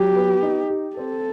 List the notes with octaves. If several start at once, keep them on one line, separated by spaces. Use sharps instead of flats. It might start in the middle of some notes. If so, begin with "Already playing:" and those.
Already playing: F#3 G4
B3
D#4
G4
C4 A4